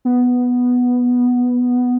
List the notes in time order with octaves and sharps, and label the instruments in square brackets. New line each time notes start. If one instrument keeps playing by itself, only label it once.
[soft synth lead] B3